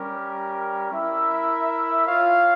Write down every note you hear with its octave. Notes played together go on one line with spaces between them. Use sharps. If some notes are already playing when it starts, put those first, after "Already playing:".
Already playing: G3 C#4 G4 A#4
E4 A#4 E5
F4 C#5 F5